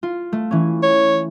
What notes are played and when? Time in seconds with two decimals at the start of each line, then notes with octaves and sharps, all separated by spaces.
0.03 F4
0.32 A3
0.51 E3 C#4
0.83 C#5